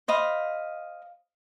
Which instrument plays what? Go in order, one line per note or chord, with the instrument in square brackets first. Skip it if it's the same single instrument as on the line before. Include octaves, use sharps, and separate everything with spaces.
[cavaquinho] C5 D#5 F5 B5